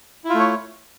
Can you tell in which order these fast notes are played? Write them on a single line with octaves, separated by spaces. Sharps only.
E4 F4 A3 C#5